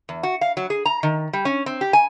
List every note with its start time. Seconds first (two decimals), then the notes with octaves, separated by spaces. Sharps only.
0.09 E2
0.23 F#4
0.41 F5
0.57 F#3
0.70 G#4
0.86 A#5
1.03 D#3
1.33 G3
1.45 C#4
1.66 C4
1.81 G4
1.93 G#5